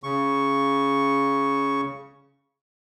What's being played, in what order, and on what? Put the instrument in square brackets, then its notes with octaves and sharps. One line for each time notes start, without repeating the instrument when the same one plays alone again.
[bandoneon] C#3 C#6